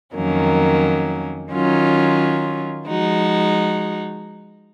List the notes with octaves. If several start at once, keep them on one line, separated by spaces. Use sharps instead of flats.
F2 D#3 F#3 A#3 C#4
D#3 F#3 C#4 F4
F3 G#3 D#4 F#4